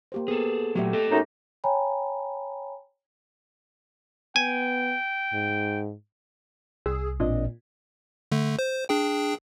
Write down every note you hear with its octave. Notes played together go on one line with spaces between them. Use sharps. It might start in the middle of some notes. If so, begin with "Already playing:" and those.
A#3 G4 C5
B3 G#4 A4
A#2 F#3 A3 G4 E5
A4 D#5
F#2 D#4
C#5 G5 G#5 A#5 B5
B3 G5 G#5
G#2
C2 G#4 E6
A1 A#2 C4 D4 D#5
D3 A3
C5
D4 G#4 G5